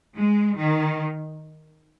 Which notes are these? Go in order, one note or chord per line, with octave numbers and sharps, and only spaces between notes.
G#3
D#3